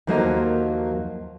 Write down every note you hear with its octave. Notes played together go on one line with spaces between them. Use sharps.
D#2 F3 F#3 A#3 A4 D#5